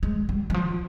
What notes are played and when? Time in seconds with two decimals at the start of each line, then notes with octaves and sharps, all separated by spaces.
0.03 G#3
0.29 G3
0.50 E3
0.54 F3